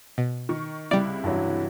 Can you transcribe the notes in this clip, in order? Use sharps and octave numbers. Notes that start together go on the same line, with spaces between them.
B2
D#3 C#6
C#2 C3 G3 E4 D5
G2 E3 F#3